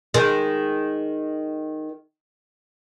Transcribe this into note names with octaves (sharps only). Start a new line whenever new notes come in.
D#3 G#3